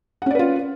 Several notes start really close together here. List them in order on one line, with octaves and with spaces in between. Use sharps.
F#5 C#4 D5 B4 F4